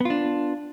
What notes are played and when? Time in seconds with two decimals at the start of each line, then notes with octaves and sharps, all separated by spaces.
0.01 B3
0.05 F4
0.10 D4